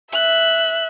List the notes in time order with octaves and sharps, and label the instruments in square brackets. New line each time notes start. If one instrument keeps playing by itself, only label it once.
[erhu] E5 [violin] F#6